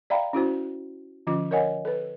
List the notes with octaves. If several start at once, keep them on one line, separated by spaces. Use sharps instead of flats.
D5 E5 F5 G5 A#5 B5
C#4 E4 F#4 C5
D3 F3 C#4 F4 D6
A#4 C#5 D#5 F#5 G#5
A4 B4